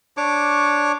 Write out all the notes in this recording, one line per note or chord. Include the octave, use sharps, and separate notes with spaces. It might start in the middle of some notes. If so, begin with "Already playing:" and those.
D4 C#5 C#6 D6